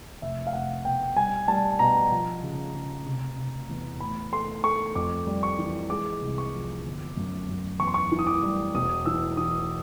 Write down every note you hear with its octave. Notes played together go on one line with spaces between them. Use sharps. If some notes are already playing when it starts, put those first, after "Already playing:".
F1 E5
F5
F1 F#5
B2 G5
G3 G#5
G3 A5
B2 A#5
F3
C#3
C#3
C3
C3
E2
A2 B5
A3 C6
A3 C#6
F2 D6
G3
C#6
E3
G#3 D6
C2
C#6
F3
G1
F#2
F#2
E2 C#6
C6
C#6
E3
D#6
D6
G3
E1 D#6
E3 E6
E3 D#6